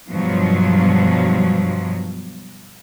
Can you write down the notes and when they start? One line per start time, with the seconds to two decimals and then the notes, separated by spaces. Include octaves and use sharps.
0.10 G2 B2 F3 F#3